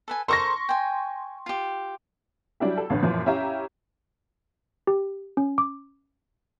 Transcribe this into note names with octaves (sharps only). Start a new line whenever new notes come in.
A4 B4 G#5
A4 A#4 C5 C6 C#6 A#6
G5 G#5
F4 G4
F#3 G3 D4 E4 G4
A4
A1 A2 D3 E3
F#2 A#2 E3 F3
C#4 E4 G4 E5 F5 A#5
G4
C#4
D6